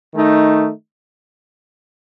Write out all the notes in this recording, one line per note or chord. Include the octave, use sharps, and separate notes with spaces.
D#3 A3 D#4